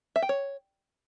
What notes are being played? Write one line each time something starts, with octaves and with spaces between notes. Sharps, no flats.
E5
G5
C#5